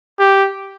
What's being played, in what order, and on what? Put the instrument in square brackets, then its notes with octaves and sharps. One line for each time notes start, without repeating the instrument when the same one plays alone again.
[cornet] G4